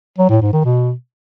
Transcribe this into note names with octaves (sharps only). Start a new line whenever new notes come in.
F#3
A2
G#2
D#3
B2